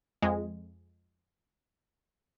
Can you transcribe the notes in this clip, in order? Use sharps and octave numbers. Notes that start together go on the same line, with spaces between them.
F2 G#3